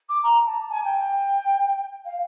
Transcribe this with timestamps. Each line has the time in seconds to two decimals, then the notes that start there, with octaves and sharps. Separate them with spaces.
0.09 D6
0.23 A#5
0.46 A5
0.69 G#5
0.84 G5
0.99 G5
2.05 F5